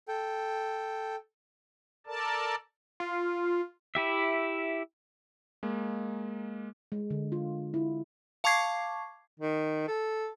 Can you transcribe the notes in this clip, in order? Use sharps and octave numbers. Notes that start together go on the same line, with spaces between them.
A4 G5
A4 A#4 D5 A5
F4
E4 G4 E5
G#3 A#3
G#3
D3
F4
E4
F5 A5 C#6 D6 G#6 C7
D#3
A4